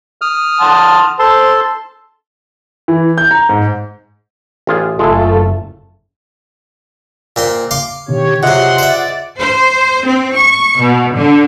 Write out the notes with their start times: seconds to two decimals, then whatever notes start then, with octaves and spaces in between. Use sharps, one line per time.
0.21 D#6 F6
0.61 F#5 A5 C6
1.19 A4 C5 A5 C6
2.88 E3
3.18 G6
3.31 A#5
3.49 G#2
4.67 A1 F4 G#4
4.99 F#1 G#3 A3 E4 F4 A4
7.36 A#2 C4 C6
7.71 F5 C6 D6
8.08 B2 D3 D#3 G4 C#5
8.43 C3 F#3 F4 G#4 D#5 F#5 C6
8.78 C5 D5 E5
9.39 C5
10.05 C4
10.34 C#6
10.80 B2
11.16 D3